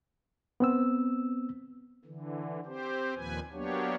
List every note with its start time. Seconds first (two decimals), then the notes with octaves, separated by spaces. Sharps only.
0.60 B3 C4 E6
2.05 D3 E3
2.66 C4 G4 C5
3.15 D#2 A#2 F3 B4 G#5
3.53 F#3 A#3 B3 D4 G4 C#5